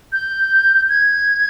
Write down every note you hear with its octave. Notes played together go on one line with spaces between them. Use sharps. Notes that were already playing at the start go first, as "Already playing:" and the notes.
G6
G#6